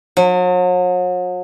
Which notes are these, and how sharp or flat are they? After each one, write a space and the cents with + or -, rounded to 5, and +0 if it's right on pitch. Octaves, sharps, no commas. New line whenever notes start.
F#3 -40